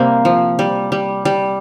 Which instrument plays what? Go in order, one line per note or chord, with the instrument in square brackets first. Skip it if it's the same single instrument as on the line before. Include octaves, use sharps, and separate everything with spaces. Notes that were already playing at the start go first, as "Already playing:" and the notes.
Already playing: [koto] C3 [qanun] G3 A#3 C4
[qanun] F3
G3
G3
G3